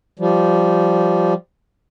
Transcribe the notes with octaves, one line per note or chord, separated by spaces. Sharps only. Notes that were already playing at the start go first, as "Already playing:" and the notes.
F3 G3